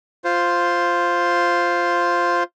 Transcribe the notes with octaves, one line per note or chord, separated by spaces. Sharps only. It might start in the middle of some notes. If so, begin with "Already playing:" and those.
F4 C5